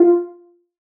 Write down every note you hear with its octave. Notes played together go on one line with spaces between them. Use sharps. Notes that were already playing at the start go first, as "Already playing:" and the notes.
Already playing: F4